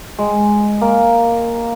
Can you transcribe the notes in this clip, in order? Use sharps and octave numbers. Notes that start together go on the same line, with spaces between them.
G#3
A#3